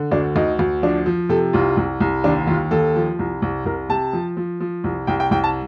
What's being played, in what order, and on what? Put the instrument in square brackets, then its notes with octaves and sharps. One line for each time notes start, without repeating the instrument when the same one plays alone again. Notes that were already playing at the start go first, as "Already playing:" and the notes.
Already playing: [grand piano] D3
D2 D4
D2 D#4
D2
F3 D4
F3
C3 A4
C2 F4
C2
C2
D#2 D4
D#2 F4
D#2 A4
F3
C2
C2
C2 A#4
C3 A5
F3
F3
F3
C2
C2 G5
G5
C2 G5
A5